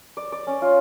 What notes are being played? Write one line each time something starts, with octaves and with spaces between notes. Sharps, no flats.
D5
D5
C#4
F4